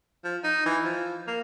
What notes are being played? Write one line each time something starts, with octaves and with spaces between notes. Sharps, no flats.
F3
D#4
E3
F3
A#3